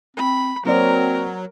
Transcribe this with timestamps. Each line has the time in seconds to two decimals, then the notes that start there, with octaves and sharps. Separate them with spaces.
0.17 C4 B5
0.65 F#3 A#3 C4 A#4 C5 D5